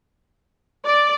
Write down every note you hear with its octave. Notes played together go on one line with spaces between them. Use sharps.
D5